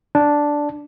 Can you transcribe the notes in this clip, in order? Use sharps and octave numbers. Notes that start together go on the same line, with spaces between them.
D4